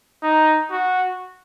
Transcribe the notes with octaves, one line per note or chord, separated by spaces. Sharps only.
D#4
F#4